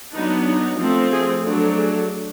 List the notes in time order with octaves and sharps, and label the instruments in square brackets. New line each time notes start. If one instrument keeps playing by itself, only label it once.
[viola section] F#3 B3 D4 D#4
D#4
F3 A3 C4
G#4
F#3 A3 D4
G#4